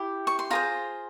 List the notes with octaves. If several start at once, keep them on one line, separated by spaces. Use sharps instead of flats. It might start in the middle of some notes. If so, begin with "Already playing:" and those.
Already playing: E4 G4
C#6
C6
F4 G#4 C5 A#5